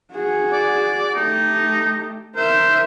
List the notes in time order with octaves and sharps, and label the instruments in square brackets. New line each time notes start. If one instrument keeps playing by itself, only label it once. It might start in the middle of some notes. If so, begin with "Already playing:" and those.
[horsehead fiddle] F#4 G#4
[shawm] D5
[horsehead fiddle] A3 G4 [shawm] D#4
[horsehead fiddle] A#4 E5 [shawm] C5